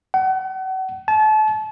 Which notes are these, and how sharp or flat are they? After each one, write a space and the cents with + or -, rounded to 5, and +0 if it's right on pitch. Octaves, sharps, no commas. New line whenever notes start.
F#5 +35
A5 -30